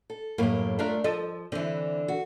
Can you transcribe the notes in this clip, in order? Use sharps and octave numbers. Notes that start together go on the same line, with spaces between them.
A4
F#2 A2 A#3 G4
A3 D4 F4 A#4
F3 A4 D#5
D3 E3 C4
F#4